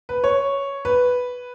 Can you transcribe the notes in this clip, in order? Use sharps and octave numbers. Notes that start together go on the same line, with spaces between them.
B4
C#5
B4